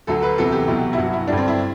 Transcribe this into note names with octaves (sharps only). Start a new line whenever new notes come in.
D2 D3 F#3 A4
B4
E2 C3 F#3 A4
G4
C2 B2 F#3
E4
G2 F#3 F#4
E4
G2 D3 G3 D4
C4
E4